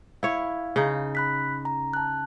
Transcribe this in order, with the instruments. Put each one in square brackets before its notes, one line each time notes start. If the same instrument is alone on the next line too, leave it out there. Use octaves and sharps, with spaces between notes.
[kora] E4 C#5 [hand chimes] F5
[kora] C#3 D#4
[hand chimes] B5 F#6 B6
A#5
A5 F#6